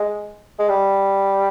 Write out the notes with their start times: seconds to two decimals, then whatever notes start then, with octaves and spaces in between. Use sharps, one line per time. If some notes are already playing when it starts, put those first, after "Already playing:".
Already playing: G#3
0.59 G#3
0.70 G3